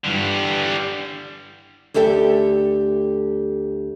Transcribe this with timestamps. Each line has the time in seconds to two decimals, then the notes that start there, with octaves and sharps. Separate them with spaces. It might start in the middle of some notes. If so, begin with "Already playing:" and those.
0.05 G2 D3 E3 G3
1.94 D2 G4 A4 E5 G5